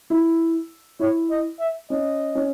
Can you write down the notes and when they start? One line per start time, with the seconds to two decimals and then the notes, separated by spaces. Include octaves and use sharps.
0.10 E4
1.00 E4 C#5
1.30 D#5
1.60 E5
1.90 C#4 D#5
2.35 C#4